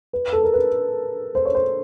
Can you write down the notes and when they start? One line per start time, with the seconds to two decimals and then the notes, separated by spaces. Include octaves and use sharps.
0.13 B4
0.33 A4
0.44 A#4
0.54 B4
1.35 C5
1.45 C#5
1.55 C5